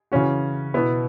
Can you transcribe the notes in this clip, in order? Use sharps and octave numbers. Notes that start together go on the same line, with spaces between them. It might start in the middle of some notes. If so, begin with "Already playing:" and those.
C#3 E3 C#4 F#4
B2 B3 E4